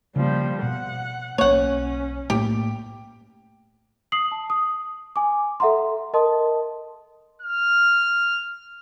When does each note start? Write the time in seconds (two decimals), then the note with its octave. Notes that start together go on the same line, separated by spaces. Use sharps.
0.16 C#3 F3 G3 A#3
0.63 B2 F#5
1.38 B1 A#3 C#4 C#5 F#5
2.30 A2 A3 A#3 G4
4.12 D#6 C7 F#7
4.32 A5
4.50 D#6
5.16 G#5 D6
5.60 A4 E5 F#5 A#5 C6
6.14 A#4 D#5 A5 C6 D#6
7.42 F6